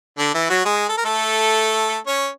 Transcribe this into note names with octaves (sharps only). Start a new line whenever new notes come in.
D3 D4
E3 E4
F#3 F#4
G#3 G#4
A4
A#4
A3 A4
C#4 C#5